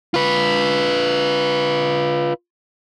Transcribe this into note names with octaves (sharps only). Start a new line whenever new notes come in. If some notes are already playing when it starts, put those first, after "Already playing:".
F4 B4